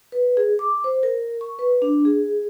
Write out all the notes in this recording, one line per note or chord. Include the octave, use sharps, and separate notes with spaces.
B4
G#4
D6
C5
A#4
C#6
B4
D4
G#4